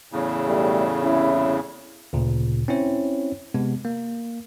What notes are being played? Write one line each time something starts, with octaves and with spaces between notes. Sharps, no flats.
E2 A2 C#3
B1 G3 A3
C2 C#4 E4
D2 A#2 C#3
C4 C#4 E4 C#5
C3 G#3 B3
A#3